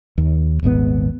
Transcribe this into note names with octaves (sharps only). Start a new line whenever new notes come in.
D#2
D#1 G#1 G#2 B3